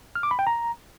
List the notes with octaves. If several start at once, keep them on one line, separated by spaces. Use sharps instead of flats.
F6
D6
B5
G5
A#5